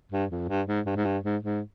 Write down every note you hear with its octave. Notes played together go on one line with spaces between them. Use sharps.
G2
F2
G2
G#2
G2
G#2
G2
G#2
G#2